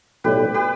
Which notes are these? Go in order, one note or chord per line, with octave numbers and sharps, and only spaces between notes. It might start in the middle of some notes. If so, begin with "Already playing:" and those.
B1 A2 G3 G4 B4
G4 B4